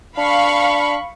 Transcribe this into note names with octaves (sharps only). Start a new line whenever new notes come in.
D4 F5 B5 C#6